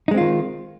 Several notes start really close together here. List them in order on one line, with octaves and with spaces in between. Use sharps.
D#4 G#3 C4 F4 D#3